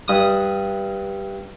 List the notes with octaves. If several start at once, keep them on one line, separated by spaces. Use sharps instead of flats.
G2 D#6